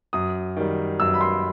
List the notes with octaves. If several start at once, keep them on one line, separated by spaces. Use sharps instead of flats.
F#2 D#6
D#3 G3
F#2 E6
B5
C6